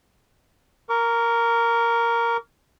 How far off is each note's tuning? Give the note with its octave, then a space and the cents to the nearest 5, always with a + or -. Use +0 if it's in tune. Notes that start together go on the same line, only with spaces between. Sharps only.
A#4 +0 C#6 +45